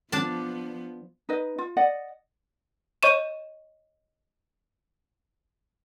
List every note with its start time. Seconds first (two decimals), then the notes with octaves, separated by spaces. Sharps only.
0.12 F3 B3 D4 A5
1.29 D#4 B4 D#5
1.58 F4
1.77 D5 D#5 F#5
3.03 C#5 D#5 C#6 D#7 E7